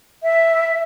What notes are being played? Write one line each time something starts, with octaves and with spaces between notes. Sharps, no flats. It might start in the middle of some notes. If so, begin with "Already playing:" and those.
E5